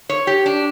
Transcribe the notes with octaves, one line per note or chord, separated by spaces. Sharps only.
C#5
G4
D4